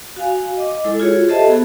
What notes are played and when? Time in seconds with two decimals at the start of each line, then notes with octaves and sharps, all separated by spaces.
0.16 F#4 F5 G#5
0.57 D#5 D6
0.84 G#3 E4 A4
1.00 F4 F#4 G#4 C#5
1.28 G4 A4 C5 D#5 E5 A5
1.48 B3 F#4 G#4 A4